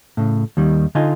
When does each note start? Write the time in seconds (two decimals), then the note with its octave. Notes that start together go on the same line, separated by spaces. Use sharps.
0.17 A2 C#3
0.57 D#2 D#3 G3
0.95 D3 D#4 F4 D#5 G#5